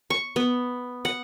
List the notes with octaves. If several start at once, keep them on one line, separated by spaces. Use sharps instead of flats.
C#6
B3
F#5